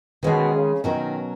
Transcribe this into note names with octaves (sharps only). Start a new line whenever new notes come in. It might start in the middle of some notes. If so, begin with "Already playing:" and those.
B2 D#3 G#3 C#4 G#4
C#3
B2 D#3 F#3 C#4 F#4 A#4